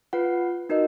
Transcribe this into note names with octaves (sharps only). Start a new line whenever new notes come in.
F4 B4 F#5
D#4 F#4 A#4 D#5